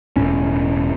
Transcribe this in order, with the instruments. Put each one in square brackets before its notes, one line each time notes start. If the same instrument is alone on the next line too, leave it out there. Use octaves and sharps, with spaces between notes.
[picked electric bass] E1 A2 C#4